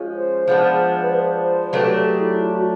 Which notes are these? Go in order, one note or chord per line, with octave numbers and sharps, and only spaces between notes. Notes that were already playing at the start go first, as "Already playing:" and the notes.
Already playing: F3 G#3 C#4
C5
F3 G#3 B3 D4
B4
C5
C5
F#3 A3 D4 G4 B4
A4
G#4
E4
F4
F#4